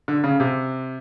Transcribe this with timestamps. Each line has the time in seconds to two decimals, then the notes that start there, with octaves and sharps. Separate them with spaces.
0.08 D3
0.24 C#3
0.40 C3